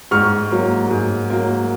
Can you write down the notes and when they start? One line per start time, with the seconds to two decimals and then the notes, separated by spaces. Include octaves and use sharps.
0.11 G#2 C#6 F6
0.51 F#3 A#3
0.90 G#2
1.30 F#3 A#3